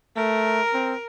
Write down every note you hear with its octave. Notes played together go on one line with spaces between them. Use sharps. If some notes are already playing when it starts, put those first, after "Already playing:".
A3 A#4
C4